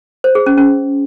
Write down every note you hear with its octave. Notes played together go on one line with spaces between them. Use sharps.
C5
G#4
C#4
C#4